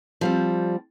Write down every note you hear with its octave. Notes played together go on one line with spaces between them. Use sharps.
F3 G3 C4